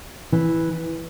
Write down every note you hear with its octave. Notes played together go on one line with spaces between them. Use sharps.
E3